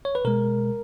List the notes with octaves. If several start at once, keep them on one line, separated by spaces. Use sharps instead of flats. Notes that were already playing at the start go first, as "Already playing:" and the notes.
C#5
B4
B2 G#3 A#4